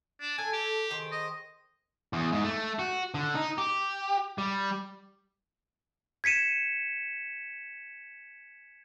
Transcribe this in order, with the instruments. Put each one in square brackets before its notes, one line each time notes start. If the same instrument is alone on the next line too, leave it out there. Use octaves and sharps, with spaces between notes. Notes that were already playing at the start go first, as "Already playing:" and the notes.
[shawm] D4
[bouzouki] A4 [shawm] G#5
[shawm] G4
[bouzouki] D#3 G#4 C5
[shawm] D#5
[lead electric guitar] E2
G#2
A3
F#4
D3
D#4
G4
G3
[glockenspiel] G#6 B6 C#7 D#7 E7